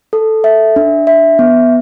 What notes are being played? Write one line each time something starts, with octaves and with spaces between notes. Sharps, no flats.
A4
E5
D4
E5
B3